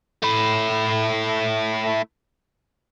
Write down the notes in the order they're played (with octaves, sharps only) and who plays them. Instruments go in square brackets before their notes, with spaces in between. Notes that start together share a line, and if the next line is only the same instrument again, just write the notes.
[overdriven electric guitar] A3 E4